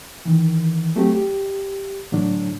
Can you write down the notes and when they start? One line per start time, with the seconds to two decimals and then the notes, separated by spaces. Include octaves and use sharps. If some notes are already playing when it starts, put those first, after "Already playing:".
0.25 D#3 E3
0.96 F#3 A3 C4 F#4 G4
1.15 G4
2.12 A2 D3 F#3 D4